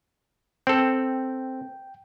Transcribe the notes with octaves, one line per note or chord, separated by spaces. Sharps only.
C4 A4 G5